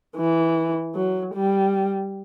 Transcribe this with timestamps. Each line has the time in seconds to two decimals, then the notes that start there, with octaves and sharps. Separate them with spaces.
0.17 E3
0.95 F#3
1.35 G3